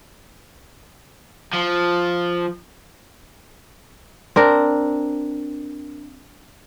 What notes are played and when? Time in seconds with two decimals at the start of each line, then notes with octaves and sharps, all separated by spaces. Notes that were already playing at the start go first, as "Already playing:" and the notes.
1.54 F3
4.36 C4 D4 A#4